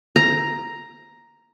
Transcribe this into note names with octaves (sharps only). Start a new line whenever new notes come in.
A#5